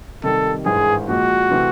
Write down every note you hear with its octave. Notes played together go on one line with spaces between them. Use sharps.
C3 D#3 G3 A4
G#1 G2 E3 G#3 G#4
A#2 F3 G#3 F#4
C3 E3 A3 C4